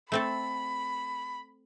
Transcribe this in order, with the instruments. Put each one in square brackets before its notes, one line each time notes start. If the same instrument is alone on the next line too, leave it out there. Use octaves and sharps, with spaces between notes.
[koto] A3 C4 A4 [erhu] B5